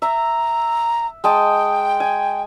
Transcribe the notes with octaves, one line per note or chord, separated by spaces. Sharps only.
E5 A#5
G#3 G5 A5 D#6
G#5